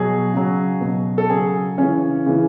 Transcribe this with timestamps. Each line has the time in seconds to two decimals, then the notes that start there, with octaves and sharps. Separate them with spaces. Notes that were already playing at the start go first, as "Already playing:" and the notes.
Already playing: B2 F#3 G#4
0.34 C#3 F#3
0.81 B2 F#3
1.18 A4
1.30 C#3 F#3 G#4
1.78 C#3 E3 C#4
2.26 C#3 E3